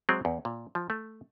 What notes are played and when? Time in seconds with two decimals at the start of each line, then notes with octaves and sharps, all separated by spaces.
0.09 F#3 G#3 C4
0.25 E2
0.45 A#2
0.75 F3
0.90 A3